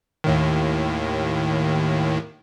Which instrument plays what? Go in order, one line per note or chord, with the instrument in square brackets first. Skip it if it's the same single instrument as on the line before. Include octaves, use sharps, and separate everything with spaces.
[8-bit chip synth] D#2 A2 D#3